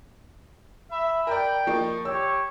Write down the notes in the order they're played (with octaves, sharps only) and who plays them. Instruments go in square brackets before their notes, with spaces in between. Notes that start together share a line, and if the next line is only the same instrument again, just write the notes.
[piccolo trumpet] E5 [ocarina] B5
[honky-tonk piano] A#4 D5 [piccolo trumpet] G5
[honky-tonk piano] F3 A#3 D#4 [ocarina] C#6
[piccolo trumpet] G4 [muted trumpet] C#5 [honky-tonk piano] E6